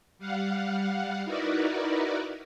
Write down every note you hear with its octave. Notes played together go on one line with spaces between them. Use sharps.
G3 F5 F#5
D#4 E4 F#4 A#4 B4 D5